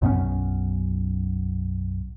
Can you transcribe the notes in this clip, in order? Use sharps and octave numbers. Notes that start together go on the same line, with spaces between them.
B1 F#2 B3 C#4